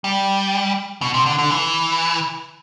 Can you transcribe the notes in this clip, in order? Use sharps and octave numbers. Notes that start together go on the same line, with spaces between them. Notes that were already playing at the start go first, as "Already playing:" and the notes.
G3
B2
C3
D3
D3
E3